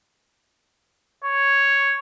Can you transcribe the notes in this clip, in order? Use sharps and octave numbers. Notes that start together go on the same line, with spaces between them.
C#5